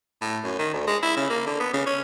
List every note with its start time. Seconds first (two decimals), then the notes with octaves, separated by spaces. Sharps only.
0.21 A2
0.44 F#2
0.59 D#3
0.73 D2
0.87 G#3
1.02 E4
1.17 C#3
1.30 A#3
1.46 D3
1.59 B3
1.73 C#3
1.86 C#4